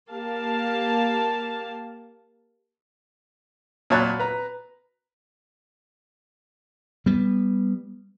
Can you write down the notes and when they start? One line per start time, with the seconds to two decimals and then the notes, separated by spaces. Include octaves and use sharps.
0.10 A#3 G4 F5 A5
3.90 A#2 F#3 C#5 A5 B5 F#6
4.20 B4 A#5
7.06 G3 B3